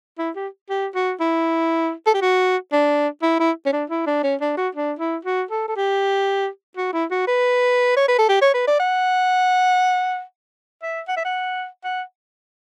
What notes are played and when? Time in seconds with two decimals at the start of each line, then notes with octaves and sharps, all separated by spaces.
0.18 E4
0.36 G4
0.69 G4
0.95 F#4
1.20 E4
2.06 A4
2.14 G4
2.21 F#4
2.72 D4
3.22 E4
3.39 E4
3.66 C#4
3.73 D4
3.90 E4
4.06 D4
4.23 C#4
4.41 D4
4.57 F#4
4.75 D4
4.99 E4
5.25 F#4
5.51 A4
5.68 A4
5.76 G4
6.77 F#4
6.93 E4
7.11 F#4
7.27 B4
7.97 C#5
8.08 B4
8.19 A4
8.29 G4
8.41 C#5
8.54 B4
8.67 D5
8.79 F#5
10.82 E5
11.08 F#5
11.16 E5
11.25 F#5
11.84 F#5